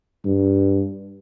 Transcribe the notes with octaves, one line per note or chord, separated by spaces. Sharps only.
G2